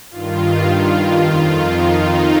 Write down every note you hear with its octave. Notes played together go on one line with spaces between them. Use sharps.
G2 D#3 F4
F4
F2 D#3 F4
D#4